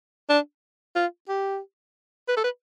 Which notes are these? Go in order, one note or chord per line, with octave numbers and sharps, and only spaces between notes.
D4
F4
G4
B4
A4
B4